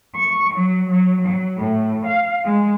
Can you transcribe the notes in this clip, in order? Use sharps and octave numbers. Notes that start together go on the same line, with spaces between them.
C#6
F#3
F#3
F#3
A2
F5
G#3